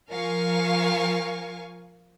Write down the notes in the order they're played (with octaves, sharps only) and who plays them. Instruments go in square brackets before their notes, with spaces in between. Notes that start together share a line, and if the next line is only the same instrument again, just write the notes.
[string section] F3 A#4 F5 G#5 C#6